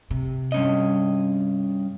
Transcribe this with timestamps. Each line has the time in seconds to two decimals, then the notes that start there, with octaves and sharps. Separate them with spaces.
0.10 C3
0.52 G2 C#4 D#5